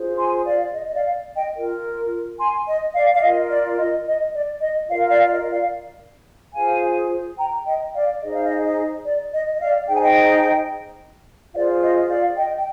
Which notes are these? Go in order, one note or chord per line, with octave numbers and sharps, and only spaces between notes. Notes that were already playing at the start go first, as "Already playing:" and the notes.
Already playing: F4 G#4 C5
G#5 C6
D5 F5
D#5
D#5
D5 F5
D#5 G5
F4 A#4
G#5 C6
D#5
D5 F5
F5
F4 A#4 D#5
D5
D#5
D#5
D5
D#5
F4 A#4 D5 F5
D5 F5
D#5
D5 F5
F4 G#4 C5 F5 G#5
G5 A#5
D#5 G5
D5 F5
D#4 G#4 C5 D#5
F5
D#5
D#5
D5
D#5
D#5
D5 F5
D#4 G#4 C5 G5
G#5
D#5 G5
F4 G#4 C5 D5 F5
D#5
D5 F5
D#5 G5
G5